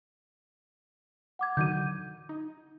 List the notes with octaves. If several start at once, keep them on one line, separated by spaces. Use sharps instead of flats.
F#5 D6 G#6
D3 D#3 F#3 G6 D#7
D#4